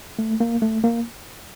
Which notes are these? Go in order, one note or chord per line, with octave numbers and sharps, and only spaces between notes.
A3
A#3
A3
A#3